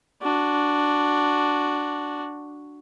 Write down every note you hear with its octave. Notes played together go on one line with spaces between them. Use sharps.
D4 F#4